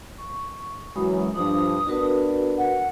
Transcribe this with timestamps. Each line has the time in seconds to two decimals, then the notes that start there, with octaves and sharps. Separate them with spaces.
0.18 C#6
0.96 F#2 E3 F#3 G#3 B5 D#6
1.36 G2 F3 D4 D#6
1.88 B3 D4 F#4 A#4 B4
2.58 F#5